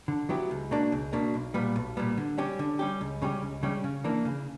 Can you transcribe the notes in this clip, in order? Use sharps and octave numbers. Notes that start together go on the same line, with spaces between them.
D3
F#3 B3 E4 G4
C#2
B2 A#3 D4
C#2
B2 A#3 D4
B1
A#2 G3 B3
B1
A#2 G3 B3
D3
G3 C#4 G4
D3
G3 C#4 G4
C#2
C#3 G3 C#4 G4
C#2
C#3 G3 C#4 G4
C#3
E3 A#3 D4
C#3